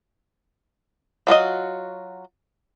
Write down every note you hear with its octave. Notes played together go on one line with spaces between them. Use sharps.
F#3 F4 F#4 D#5